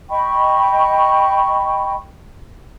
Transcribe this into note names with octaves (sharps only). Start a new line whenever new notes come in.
D#5 G5 B5 C#6